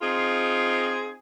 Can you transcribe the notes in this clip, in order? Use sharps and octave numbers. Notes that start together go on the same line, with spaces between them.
C4 D#4 F4 G#4